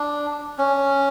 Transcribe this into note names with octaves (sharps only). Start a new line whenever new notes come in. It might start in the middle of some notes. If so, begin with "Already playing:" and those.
Already playing: D4
C#4